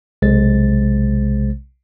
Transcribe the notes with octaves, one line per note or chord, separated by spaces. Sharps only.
B1 C3 G#3 C5 A6